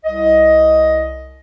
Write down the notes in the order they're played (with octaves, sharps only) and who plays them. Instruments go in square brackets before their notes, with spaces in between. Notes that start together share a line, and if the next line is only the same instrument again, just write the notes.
[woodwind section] C2 D#5